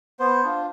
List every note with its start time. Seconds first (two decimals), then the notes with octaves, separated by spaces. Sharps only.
0.19 B3 C5
0.43 D4 F4